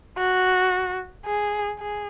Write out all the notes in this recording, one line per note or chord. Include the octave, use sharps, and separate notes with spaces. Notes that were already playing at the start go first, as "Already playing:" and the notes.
F#4
G#4
G#4